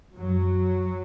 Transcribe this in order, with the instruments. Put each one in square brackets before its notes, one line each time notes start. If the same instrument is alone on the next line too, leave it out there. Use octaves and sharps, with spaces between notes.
[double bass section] F#2 F#3